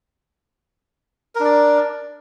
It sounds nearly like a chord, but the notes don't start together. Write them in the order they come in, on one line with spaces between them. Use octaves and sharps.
A#4 D4 D5